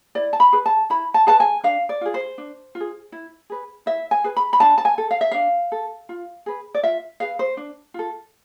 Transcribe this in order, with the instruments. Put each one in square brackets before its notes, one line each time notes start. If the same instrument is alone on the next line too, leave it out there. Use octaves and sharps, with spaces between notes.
[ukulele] E4 D5
A5
B5
G#4 B4
A5
E4 B5
A5
G#4 B4 A5
G#5
D4 F5
D5
F4 G#4
C5
D4
F4
G#4
E4
G#4 B4
E4 E5
G#5
G#4 B4
B5
B5
D4 A5
A5
G#5
A4
F5
E5
D4 F5
A4
F4
G#4 B4
D5
F4 E5
G#4 B4 F5
C5
D4
F4 A4